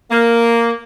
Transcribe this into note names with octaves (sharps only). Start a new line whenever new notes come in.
A#3